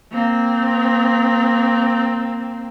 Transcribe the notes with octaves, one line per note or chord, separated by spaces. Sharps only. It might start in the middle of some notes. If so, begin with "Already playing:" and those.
A#3 C4